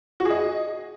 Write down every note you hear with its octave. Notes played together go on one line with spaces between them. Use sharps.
F#4
G#4
D#5